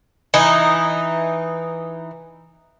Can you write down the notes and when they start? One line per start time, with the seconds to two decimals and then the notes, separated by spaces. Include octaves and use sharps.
0.34 E3 D#4